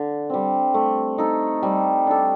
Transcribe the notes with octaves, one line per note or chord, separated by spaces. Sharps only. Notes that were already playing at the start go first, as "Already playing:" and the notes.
Already playing: D3
G3 C4
A3
D#4 A4
G3
D4 A4